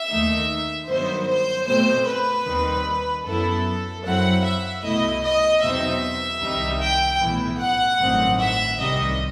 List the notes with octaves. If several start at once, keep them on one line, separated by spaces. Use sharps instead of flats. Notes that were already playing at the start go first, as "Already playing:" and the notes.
Already playing: E5
D#2 D#3 A3 D#4
G2 D#3 F#3 B3 C5
C5
B2 A3 C4 C5
B4
D#2 D#3 G3 C4
F#2 F#3 B3 E4 A4
F#2 F#3 C4 E4 F#5
E5
C2 B2 A3 E4 D#5
D#5
E2 B2 F#3 C4 D#4 E5
C2 C3 D#3 G3 D#4
G5
B1 A2 E3 B3 E4
F#5
A1 G2 D#3 F#3 C4
E5
C2 C3 D#3 G3 D#5